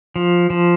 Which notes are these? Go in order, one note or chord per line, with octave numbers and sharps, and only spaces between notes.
F3
F3